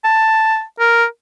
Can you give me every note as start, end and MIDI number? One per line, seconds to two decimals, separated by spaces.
0.04 0.62 81
0.79 1.04 70